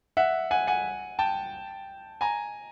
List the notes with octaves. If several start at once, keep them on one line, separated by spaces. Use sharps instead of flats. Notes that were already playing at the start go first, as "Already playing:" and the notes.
E5 F#5
F#5 G#5
F#5 G#5
G5 A5
G#5 A#5